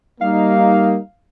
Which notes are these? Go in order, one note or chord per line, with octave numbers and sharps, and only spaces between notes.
G3 A#3 D#4 F5